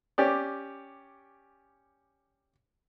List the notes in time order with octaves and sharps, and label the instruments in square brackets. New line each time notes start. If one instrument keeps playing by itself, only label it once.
[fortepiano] C#4 G4 D5